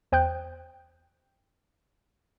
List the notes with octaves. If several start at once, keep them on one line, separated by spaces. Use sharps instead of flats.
E2 C5 G5 D#6 F#6 G6